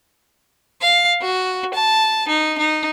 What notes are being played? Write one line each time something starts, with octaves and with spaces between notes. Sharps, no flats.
F5
F#4
A5
D#4
D#4